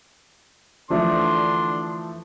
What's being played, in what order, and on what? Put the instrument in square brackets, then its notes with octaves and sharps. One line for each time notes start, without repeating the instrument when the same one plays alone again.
[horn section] D3 D4 C6 [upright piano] E3 F3 A3